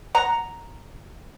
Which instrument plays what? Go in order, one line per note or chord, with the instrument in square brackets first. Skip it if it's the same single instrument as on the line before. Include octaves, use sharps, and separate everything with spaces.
[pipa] F#5 A#5